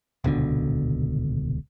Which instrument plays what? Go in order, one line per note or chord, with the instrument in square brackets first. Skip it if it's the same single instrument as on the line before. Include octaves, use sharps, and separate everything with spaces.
[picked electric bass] D#1 C#2 B2 D3